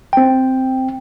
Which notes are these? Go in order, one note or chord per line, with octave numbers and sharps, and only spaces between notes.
C4 G5